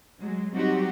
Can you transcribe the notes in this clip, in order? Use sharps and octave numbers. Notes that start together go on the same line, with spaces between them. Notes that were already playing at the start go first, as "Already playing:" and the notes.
F#3 G#3
F#3 G3 C4 D#4 F#4 G4